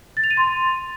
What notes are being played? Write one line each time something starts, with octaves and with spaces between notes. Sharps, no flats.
A6
F7
D#7
C6
A6